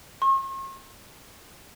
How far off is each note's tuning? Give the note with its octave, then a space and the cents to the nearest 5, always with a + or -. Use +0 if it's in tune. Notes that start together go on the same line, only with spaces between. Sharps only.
C#6 -45